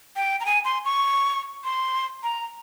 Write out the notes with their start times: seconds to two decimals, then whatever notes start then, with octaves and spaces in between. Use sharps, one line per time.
0.16 G5
0.40 A#5
0.46 G#5
0.65 C6
0.85 C#6
1.64 C6
2.23 A#5